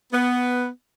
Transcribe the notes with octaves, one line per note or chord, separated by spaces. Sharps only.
B3